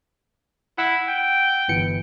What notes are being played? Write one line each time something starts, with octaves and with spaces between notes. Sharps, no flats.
E4 F#5 E6
G5
G1 E3 C#7